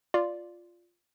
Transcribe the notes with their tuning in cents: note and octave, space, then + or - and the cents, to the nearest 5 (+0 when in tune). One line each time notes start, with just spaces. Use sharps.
F4 +0 D5 +0